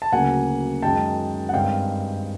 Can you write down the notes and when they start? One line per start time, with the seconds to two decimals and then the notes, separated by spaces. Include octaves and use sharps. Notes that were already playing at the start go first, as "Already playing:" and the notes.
0.02 A5
0.12 D2 C#3 F#3 A#3 F#5 G#5
0.82 F#2 D#3 G#3 G5 A5
1.49 F#5
1.53 G2 D#3 G#3 C4 F5 G5